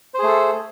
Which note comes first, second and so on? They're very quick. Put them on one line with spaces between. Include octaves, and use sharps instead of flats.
C5 G#4 A3 A4